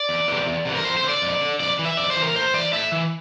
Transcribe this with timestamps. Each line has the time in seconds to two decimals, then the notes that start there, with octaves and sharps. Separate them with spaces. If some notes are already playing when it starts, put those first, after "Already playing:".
Already playing: D5
0.09 E2
0.28 C3 E3
0.47 E2
0.65 C3 E3
0.75 A#4
0.84 F2 C5
0.97 C5
1.03 D3
1.09 D5
1.22 F2
1.41 D3
1.60 F2 D5
1.79 E3
1.85 E5
1.97 F2 D5
2.10 C5
2.16 E3
2.23 A#4
2.35 A2 C5
2.54 E3 D5
2.73 A2 E5
2.92 E3